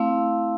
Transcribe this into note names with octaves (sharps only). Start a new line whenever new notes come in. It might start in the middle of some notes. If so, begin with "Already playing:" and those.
Already playing: A3 C4 E4 F5